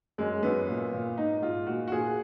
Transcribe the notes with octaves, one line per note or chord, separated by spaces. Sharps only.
F#2 G#3
F#2 B3
A#2
A#2
G#2 D#4
G#2 F4
A#2 F#4
F#4
A#2 G#4